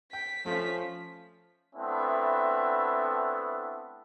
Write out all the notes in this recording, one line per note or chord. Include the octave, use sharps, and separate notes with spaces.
G5 B6
F3 A3 C#4
A3 B3 C4 D4 E4 E5